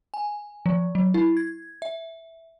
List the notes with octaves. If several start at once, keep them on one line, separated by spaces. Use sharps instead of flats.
G#5
F3
F#3
E4
G#6
E5